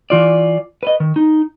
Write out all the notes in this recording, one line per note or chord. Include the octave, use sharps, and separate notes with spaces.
E3 F4 D5
B4 D#5
D#3
D#4